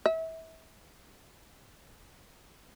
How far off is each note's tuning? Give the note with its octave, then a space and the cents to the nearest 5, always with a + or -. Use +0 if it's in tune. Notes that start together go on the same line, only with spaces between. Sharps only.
E5 -30